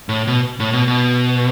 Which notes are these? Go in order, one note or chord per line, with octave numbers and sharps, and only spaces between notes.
A2
B2
A2
B2
B2